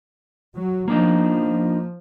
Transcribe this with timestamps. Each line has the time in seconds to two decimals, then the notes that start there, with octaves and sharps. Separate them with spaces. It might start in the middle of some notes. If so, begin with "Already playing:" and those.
0.54 F#3
0.88 F3 A#3 D4 D#4